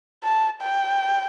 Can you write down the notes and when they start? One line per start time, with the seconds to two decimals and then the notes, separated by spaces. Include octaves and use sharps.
0.24 A5
0.61 G5